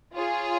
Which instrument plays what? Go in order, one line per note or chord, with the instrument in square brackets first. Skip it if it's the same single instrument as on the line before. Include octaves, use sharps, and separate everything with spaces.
[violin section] F4 G#4 C#5